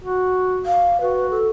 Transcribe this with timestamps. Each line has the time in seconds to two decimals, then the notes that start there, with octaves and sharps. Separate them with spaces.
0.04 F#4
0.66 F5
1.01 F#4 B4
1.31 A4